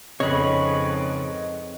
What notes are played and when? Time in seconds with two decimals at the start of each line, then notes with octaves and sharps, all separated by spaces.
0.20 F2 G#2 C#3 B4 C#5 D#5 B5